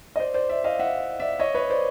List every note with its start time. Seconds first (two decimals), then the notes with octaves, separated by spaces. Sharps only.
0.16 D#5
0.19 C5 D5
0.34 C5 D5
0.49 D5 E5
0.64 D#5 F5
0.79 E5 F#5
1.19 D5 E5
1.39 C#5 D#5
1.54 B4 C#5
1.70 C5 D5